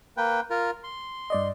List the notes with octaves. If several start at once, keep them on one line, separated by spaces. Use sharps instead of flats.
A#3 B4 G5
F4 A#4
C6
G2 D5 D#5